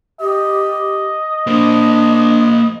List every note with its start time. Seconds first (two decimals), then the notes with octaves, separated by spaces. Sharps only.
0.21 G4 D#5
1.47 A#3 D4 C5